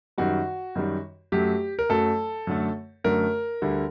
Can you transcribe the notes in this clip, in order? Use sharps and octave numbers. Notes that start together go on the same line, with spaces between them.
F#2 D#3 G3 F#4
F#2 D#3 G3
F#2 F#3 A3 G4
A#4
F#2 F#3 A3 A4
F#2 D3 A3
F#2 D3 A3 A#4
D2 D3 G3